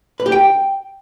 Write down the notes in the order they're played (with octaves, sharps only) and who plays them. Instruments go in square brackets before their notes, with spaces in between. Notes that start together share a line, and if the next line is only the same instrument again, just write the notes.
[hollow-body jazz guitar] B4
G4
G5